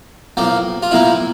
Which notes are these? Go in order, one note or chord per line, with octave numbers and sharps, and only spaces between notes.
B1 A2 F3 A#3
F4
B1 A2 F3 A#3 E4